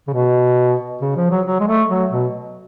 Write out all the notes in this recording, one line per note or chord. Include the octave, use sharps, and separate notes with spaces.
C#3
B2
C#3
F3
F#3
F#3
G#3
A3
F#3
B2